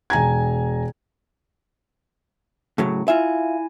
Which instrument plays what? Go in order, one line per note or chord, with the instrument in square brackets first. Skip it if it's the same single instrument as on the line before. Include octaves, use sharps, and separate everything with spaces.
[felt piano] E1 G#5 A#5 G#6
[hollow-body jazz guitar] A2 C#3 F#3
[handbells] E4 G#5 [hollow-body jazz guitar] F4 E5